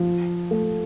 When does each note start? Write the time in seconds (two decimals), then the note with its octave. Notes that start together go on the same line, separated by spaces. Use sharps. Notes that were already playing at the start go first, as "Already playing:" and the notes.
Already playing: F3
0.51 A3